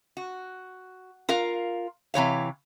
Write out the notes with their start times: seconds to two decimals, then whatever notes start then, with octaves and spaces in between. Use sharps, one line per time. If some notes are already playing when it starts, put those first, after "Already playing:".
0.17 F#4
1.29 F4 A#4 F5
2.14 C3 E3 C#5 F5